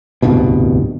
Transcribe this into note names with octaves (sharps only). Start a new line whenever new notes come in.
D1 C2 G2 B2